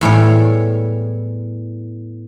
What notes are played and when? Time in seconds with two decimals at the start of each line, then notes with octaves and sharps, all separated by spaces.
0.01 E2 A2 G3 C#5